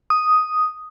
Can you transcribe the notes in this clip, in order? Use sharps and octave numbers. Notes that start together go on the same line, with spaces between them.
D#6